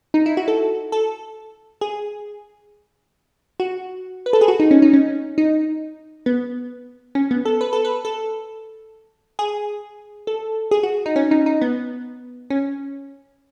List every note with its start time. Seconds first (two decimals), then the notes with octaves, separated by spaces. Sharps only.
0.14 D#4
0.26 E4
0.37 F#4
0.48 A4
0.92 A4
1.81 G#4
3.60 F#4
4.26 B4
4.33 A4
4.41 G#4
4.48 F#4
4.60 D#4
4.71 C#4
4.82 D#4
4.93 C#4
5.38 D#4
6.26 B3
7.15 C#4
7.31 B3
7.45 A4
7.61 B4
7.73 A4
7.85 B4
8.05 A4
9.39 G#4
10.27 A4
10.71 G#4
10.83 F#4
11.06 D#4
11.16 C#4
11.31 D#4
11.46 D#4
11.62 B3
12.50 C#4